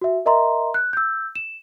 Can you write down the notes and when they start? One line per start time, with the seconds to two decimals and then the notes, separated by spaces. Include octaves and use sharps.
0.01 F#4 E5
0.26 A#4 D#5 E5 A#5 C6
0.74 F#6
0.93 E6 G6
1.35 E7